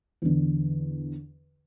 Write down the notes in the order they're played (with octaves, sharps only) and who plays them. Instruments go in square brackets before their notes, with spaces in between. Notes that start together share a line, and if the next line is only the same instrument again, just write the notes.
[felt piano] E2 D3